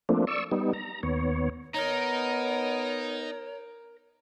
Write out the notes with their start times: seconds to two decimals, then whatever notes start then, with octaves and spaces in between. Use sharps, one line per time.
0.09 F3 A3 A#3 C4 D4
0.27 D5 C#6 E6
0.51 G3 B3 D#4
0.74 A#5
1.03 D#2 B3 C#5
1.74 B3 D#4 A#4 C#5 A#5